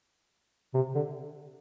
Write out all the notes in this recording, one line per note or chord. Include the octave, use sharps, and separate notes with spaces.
C3
D3